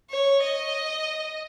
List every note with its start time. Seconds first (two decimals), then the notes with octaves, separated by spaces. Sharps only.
0.10 C#5
0.42 D#5